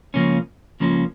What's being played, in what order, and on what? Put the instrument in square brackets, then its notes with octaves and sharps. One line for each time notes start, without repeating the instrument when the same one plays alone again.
[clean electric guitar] C#2 C#3 F3 A#3 C#4
C#2 C#3 F3 A#3 C#4